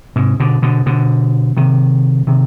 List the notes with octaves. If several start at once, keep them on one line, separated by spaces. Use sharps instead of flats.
G#2 C3
B2 D3
B2 D3
B2 D3
C3 D#3
C3 D#3